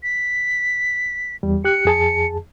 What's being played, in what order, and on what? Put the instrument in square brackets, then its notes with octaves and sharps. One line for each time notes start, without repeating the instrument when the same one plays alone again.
[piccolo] B6
[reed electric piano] E2 G3
[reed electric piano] G4 F#6 [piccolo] C#7
[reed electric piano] F2 G#4 A5